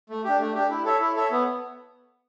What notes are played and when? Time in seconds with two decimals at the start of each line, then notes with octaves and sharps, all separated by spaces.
0.10 A3
0.25 D4 G4
0.40 A3
0.55 D4 G4
0.70 E4
0.85 A4 C#5 E5
1.00 E4
1.16 A4 C#5 E5
1.31 B3